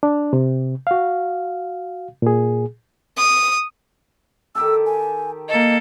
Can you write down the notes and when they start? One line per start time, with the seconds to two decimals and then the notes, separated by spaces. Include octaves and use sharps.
0.03 D4
0.33 C3
0.87 F#4 F5
2.22 A#2 G#4
3.17 D#6
4.55 D#3 G4 A4 E6
4.86 G#5
5.49 A#3 A4 D#5